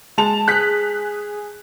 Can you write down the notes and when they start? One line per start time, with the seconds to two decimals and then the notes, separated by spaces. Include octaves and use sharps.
0.18 G#3 A5 F7
0.48 G#4 F#6 B6